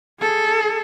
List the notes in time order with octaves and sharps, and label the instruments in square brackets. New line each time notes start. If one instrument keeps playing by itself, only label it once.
[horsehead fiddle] G#4 A4